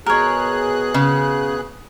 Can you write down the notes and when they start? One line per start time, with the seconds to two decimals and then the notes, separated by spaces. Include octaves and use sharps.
0.06 B2 G#4 A#4 C#5 F#6
0.94 C#3